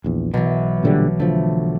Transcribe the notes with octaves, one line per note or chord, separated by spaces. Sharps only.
A#1 E2
B1 B2 E3
A#2 D3 G3
D3 F3 A3